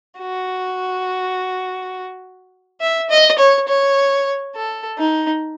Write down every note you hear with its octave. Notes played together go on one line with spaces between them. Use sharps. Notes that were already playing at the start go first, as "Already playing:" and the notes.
F#4
E5
D#5
C#5
C#5
A4
D#4